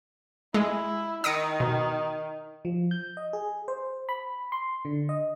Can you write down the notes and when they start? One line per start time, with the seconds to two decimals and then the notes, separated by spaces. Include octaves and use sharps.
0.54 G#3 E4
1.24 D#3 D#6 A#6 C#7
1.60 B2
2.65 F3
2.91 G6
3.17 D#5
3.33 G#4
3.68 C5
4.09 B5
4.52 C6
4.85 D3
5.09 D#5